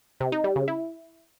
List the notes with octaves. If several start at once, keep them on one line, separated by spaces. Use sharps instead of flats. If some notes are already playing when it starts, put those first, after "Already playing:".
C3
D#4
G3
C#3
E4